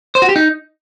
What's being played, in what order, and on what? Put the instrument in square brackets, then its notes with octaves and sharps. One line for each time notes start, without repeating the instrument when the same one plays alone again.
[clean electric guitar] C5
F#4
G4
D#4